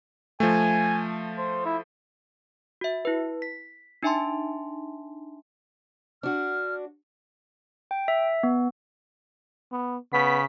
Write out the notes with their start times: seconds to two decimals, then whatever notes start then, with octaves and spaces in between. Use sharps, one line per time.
0.40 F3 A3 G#5
1.38 C5
1.66 E4
2.81 F#4 E5
3.05 E4 B4
3.42 B6
4.03 D4 D#4 E5 G#5 A5 C6
6.23 D4 F#4 F6
7.91 G5
8.08 E5
8.43 B3
9.72 B3
10.13 C#3 B3 B6